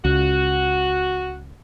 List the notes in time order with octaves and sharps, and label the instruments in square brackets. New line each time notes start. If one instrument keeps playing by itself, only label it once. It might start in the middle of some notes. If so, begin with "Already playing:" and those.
[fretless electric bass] C#2 [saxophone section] F#4